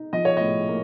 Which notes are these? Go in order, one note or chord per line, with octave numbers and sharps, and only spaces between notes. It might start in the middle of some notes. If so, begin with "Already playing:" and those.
Already playing: D#4
F3 D#5
C#5
A2 D#5
A#3